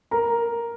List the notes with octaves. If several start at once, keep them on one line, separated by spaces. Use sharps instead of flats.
A#4 A#5